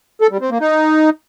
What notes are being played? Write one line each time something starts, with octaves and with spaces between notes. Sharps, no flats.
A4
G3
C4
A#3
D#4